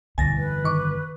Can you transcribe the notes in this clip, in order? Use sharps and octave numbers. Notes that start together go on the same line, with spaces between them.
G1 D2 B2 E3 G#5 A6 A#6
F2 B4
D#3 C#6 D6